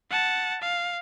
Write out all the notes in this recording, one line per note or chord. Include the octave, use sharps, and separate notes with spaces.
F#5 A5
F5